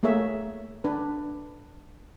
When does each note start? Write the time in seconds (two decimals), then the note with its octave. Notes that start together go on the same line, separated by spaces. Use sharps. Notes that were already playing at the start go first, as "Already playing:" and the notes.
0.03 A3 A#3 G#4 C#5 E5
0.84 D4 B4